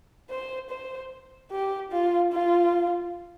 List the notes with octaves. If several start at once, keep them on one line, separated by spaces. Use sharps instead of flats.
C5
C5
G4
F4
F4